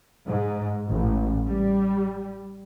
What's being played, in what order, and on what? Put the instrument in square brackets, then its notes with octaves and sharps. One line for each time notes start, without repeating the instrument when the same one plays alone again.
[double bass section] G#2
A1
G3